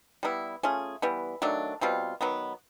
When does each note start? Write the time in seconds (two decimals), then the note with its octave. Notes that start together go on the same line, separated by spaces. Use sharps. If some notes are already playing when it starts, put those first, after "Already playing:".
0.23 G3 B3 E4
0.63 A3 C#4 F4 G#4
1.02 E3 G3 B3
1.42 D#3 F#3 A3 D4
1.81 B2 G3 C4 F4
2.21 D#3 F#3 B3